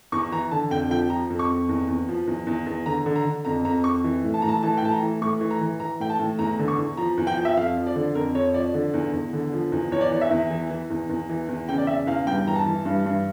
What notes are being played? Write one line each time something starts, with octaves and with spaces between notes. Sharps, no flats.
E2 C#6
E3 A#5
D3 A5
F2 G5
F3 G5
F3 A#5
F2
C#6
F2
E2
E2
F3
E2
E2
E2
D3 A#5
D3
A#5
D3
F2 A#5
F2 A#5
F2 C#6
E3
A2
A5
A2 A#5
A5
E3 A5
G5
A2 A5
A#5
E3
A2 C#6
E3
A#5
E3
E3 A#5
A2 G5
A5
A2
E2 A#5
D3
C#6
E2
F3 A#5
E2
G5
F3
E5
F2 F5
F3
D5
D3
F2 A#4
F2 C#5
C#5
F3 D5
D3
E2
E2
D3
F3
E2
E2 C#5
D5
E3 C#5
E5
E2
E3
E3
E2
E2
E3
E2
C#3 G5
D5
C#3 E5
E2 F5
G2 G5
E3 A#5
A5
E3
G2
G2